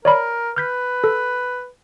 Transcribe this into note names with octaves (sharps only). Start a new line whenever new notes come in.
A#4 C#5 D5 B5
B4 F6 G6 B6
A4